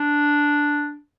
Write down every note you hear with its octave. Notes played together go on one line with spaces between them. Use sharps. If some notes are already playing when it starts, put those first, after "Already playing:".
Already playing: D4